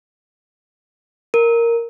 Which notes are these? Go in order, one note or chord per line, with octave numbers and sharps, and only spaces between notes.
A#4